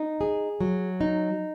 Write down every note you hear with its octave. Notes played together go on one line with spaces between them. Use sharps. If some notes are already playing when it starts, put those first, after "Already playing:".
Already playing: D#4
G#4
F#3
D#4